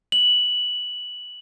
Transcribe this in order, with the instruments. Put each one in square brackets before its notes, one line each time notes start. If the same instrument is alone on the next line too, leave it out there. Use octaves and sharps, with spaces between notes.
[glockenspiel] F#7